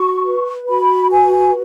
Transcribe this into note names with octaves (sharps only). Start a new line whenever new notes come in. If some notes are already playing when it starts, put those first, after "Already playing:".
Already playing: F#4 C#6
B4
F#4 B5
B4 G#5